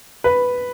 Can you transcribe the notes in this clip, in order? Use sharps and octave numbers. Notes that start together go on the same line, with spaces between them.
B4